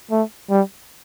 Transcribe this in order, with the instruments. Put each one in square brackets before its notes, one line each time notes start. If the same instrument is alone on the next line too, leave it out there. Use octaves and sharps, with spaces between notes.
[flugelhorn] A3
G3